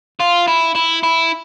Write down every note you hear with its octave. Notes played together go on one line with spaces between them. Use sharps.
F4
E4
E4
E4